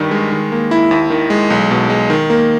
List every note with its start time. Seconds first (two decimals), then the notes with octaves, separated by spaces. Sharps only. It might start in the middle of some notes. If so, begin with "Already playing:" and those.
Already playing: G2 D#3 G3
0.11 G#3
0.32 D#3
0.52 A#3
0.71 E4
0.91 D#2
1.10 D#3
1.30 G#3
1.50 B1
1.71 B2
1.90 G#3
2.10 D#3
2.30 A#3